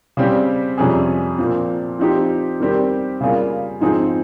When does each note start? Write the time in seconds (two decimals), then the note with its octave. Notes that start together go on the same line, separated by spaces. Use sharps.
0.17 C#3 G3 C4 G4
0.78 F2 C3 G3 C#4 G#4
1.38 A#2 F3 C4
1.99 F3 C4 D#4 G4
2.60 D#3 G3 C4 G4
3.21 C#3 G3 A#3 F4 G#4
3.81 G#2 F3 C4 D#4 G#4